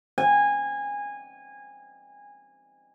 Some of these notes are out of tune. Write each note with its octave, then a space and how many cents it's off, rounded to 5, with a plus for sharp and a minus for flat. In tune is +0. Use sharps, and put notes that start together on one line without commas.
G#5 -20